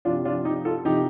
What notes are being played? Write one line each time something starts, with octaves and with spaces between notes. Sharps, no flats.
C3 F3 D4 F4
D4 F4
D#4 G4
F4 A4
C3 F3 D#4 G4